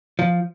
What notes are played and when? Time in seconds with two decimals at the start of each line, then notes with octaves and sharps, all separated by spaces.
0.19 F3